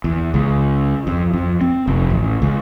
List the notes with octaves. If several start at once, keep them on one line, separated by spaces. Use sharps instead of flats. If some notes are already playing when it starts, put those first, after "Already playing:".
E2
C#2
F2
F2
C4
F1
A1
C#2